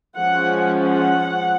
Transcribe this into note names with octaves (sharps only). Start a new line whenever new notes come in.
F3 G#3 C#4 F#5
F#5